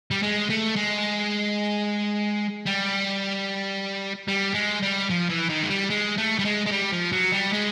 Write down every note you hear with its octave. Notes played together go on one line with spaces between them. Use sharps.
G3
G#3
A3
G#3
G3
G3
G#3
G3
F3
E3
D#3
G#3
G3
G#3
A3
G3
G#3
G#3
G3
F3
F#3
G3
G#3